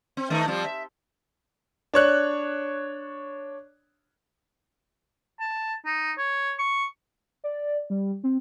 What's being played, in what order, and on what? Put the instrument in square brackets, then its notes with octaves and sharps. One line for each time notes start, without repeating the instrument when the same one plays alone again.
[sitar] C4
D#3 A3 D#4
F3 G3 C4
E5
[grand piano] D4 C#5 F#6
[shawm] A5
D#4
C#5
C#6
[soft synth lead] D5
G3
C4